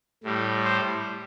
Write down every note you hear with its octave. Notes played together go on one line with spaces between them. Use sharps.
A2 G3
C5